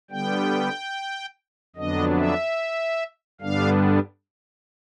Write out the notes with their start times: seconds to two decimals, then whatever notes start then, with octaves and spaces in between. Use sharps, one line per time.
0.11 D3 G3 B3 G5
1.76 F2 D3 F#3 B3 D4 D#5
2.17 E5
3.41 G2 D3 G3 B3 D4 F5